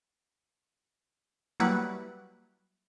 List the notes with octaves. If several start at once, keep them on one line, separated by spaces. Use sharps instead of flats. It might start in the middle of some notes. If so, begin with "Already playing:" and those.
F#3 G3 A#3 E4 B4 F#5